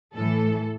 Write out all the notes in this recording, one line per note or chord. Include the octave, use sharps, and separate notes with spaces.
A2 E3 A4